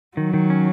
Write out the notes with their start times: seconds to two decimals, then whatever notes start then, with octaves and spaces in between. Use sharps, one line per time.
0.17 D#3 F#3
0.34 D#3
0.50 C#4